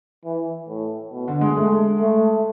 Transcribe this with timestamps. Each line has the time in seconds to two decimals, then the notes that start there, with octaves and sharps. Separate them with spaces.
0.25 E3
0.69 A2
1.13 B2
1.28 D3
1.41 G#3
1.57 G#3 A3
2.00 A3